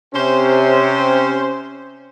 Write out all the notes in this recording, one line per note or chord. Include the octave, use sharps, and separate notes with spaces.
C3 C#4 C5